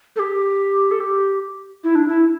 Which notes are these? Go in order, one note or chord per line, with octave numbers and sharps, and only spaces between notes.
A4
G4
A4
G4
E4
D4
E4